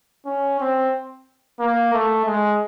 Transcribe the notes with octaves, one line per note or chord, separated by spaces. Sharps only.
C#4
C4
A#3
A3
G#3